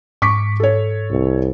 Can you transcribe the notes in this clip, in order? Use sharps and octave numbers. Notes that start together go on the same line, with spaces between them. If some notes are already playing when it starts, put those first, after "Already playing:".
G#2 C#6 D6 B6
A4 C#5
C2